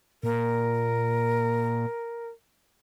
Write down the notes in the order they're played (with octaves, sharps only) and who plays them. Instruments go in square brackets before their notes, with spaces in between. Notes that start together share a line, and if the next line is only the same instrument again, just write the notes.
[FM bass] A#2 [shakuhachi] A#4